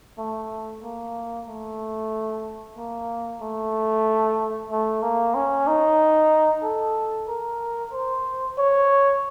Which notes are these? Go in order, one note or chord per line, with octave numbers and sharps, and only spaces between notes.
A3
A#3
A3
A#3
A3
A3
A#3
C#4
D#4
A4
A#4
C5
C#5